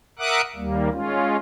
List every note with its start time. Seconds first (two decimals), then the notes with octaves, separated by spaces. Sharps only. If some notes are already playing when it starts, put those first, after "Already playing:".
0.19 A#4 E5 F#5 D6 D#6 F#6
0.56 D#2 G3 A#3
0.92 G#3 C#4 F4